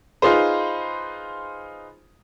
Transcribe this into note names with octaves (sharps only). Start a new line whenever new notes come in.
D#4 F4 G#4 B4 C5